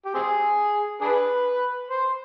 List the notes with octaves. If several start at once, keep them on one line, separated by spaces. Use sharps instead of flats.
G4
C4 G#4
D4 G#4 B4
C5